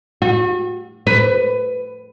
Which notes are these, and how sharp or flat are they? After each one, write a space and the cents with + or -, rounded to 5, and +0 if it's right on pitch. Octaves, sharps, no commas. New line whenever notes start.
F#4 -40
B4 +20